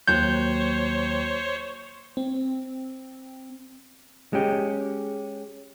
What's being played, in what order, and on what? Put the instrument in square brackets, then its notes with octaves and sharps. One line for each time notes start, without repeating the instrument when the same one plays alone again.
[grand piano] D#2 F#3 F#6 [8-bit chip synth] C5 C#5 [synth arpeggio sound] G6
[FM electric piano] C4
[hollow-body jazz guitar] G#3 C#4 G4